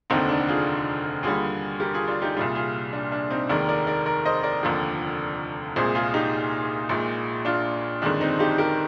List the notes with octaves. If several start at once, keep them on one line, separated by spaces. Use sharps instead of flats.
F1 D#2 D3 C4 D#4
D4
F4 G#4
D#2 D3 G3 F4 G#4
G4 A#4
F4 G#4
D4 F4
D#4 G4
C2 A#2 G3 F4 G#4
F4 G#4
D4
D4
C4 D#4
F1 D#2 D#3 G#3 A#4 D5
A#4 D5
A#4 D5
A#4 D5
C5 D#5
A#4 D5
F1 D#2 D3 F3
C2 A#2 G#3 G#4 C5
F4 G#4
D#4 G4
A#1 A#2 G#3
D4 F4
G1 F2 D#3 G#3 D4
C4 D#4
D#4 G4
G4 A#4